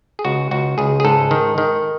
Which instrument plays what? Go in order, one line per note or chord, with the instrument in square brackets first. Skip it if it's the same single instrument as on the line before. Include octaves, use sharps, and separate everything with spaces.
[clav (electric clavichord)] G#4
C#2 F#4
C#2 F#4
C#2 G#4
G#4
G#2 A4
D#3
D#3